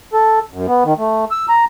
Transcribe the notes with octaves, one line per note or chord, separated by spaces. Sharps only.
A4
F#2
B3
D#3
A3
E6
A#5